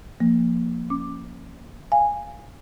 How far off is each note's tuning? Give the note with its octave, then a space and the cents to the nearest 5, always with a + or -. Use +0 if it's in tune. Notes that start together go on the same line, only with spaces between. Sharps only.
F3 -5 A#3 +0
C#4 +0 D6 +10
F5 +0 G#5 -10